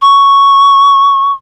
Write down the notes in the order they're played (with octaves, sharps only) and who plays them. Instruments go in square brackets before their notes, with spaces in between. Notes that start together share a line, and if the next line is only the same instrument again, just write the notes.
[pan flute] C#6